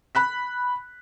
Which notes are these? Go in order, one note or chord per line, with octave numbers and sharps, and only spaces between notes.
B5 F#6 B6